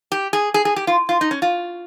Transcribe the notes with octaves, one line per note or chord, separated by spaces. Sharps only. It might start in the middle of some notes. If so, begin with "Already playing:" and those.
G4
G#4
G#4
G#4
G4
F4
F4
D#4
C#4
F4